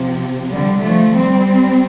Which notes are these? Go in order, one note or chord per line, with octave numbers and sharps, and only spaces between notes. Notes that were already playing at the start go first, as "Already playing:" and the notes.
Already playing: C3 F3
D3 G3
F3 A3
G3 C4